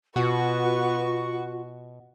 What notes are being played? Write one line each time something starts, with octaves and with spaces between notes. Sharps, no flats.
B2 B3 F4 F#4 C#6